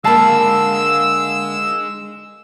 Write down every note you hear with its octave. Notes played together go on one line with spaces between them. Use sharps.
D3 G#3 A#3 F5 A5 B5 E6